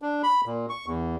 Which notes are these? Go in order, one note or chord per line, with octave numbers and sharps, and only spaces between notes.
D4
B5
A#2
C#6
E2